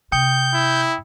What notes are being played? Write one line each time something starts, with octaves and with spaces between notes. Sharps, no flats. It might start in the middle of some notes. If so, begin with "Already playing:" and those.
C3 G5 D#6 G6 C#7
E4